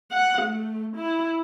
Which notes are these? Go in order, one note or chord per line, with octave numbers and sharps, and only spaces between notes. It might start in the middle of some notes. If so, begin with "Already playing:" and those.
F#5
A3
E4